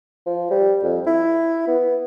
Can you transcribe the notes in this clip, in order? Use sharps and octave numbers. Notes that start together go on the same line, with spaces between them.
F3
G3
F2
E4
B3